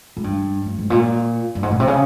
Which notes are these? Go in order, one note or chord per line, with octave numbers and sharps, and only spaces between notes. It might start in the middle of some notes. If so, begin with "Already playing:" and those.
G#2
G2
G2
G#2
A#2
G2
G#2
A#2
C3
C#3